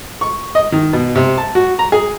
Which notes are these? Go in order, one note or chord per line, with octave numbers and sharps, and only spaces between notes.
C#6
D#5
D#3
B2
C3
A5
F#4
A#5
G#4